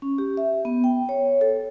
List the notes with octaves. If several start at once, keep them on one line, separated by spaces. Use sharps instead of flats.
C#4
G4
E5
B3
G5
C#5
A4